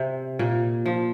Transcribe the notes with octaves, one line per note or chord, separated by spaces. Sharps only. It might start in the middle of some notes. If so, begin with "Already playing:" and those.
Already playing: C3
A#2
F3